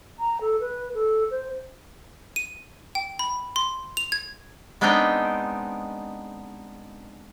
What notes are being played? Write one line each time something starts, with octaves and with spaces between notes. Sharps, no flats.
A#5
A4
B4
A4
C5
D#7
G5
B5
C6
F7
G#6
G#3 B3 C4 D4 D#4 G5